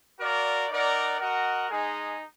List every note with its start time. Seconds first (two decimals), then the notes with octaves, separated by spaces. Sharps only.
0.19 F#4 A#4 D5 F5
0.70 D#4 A#4 D5 F#5
1.20 F#4 A#4 D#5 F#5
1.70 G#3 D#4 G#4